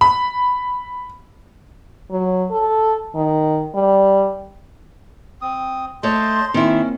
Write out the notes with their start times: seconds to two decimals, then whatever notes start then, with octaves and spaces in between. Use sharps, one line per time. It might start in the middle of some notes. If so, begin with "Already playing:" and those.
0.01 B5
2.11 F#3
2.51 A4
3.15 D#3
3.75 G3
5.42 C4 D#6
6.03 A3 C5 C#5 D#5 A5 C6
6.54 D#3 A#3 C4 C#4 E4